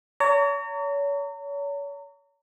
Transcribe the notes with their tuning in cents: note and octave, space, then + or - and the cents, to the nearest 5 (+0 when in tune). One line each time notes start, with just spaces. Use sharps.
C#5 +35 A#5 -35